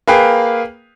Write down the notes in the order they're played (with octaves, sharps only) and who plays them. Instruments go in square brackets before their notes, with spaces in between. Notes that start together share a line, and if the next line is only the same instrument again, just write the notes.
[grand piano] A#3 G#4 B4 F5 G5